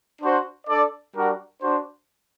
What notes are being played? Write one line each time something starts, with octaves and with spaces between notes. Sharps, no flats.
D4 F#4 C5 F#5
D4 A4 D5
G3 D4 F#4 A#4
D4 F#4 C5